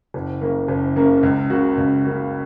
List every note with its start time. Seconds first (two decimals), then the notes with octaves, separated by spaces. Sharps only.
0.14 F#1
0.41 F#2 C#3 A#3
0.68 F#1
0.96 F#2 C#3 A#3
1.23 C#2
1.50 C#3 A#3 F#4
1.78 C#2
2.04 C#3 A#3 F#4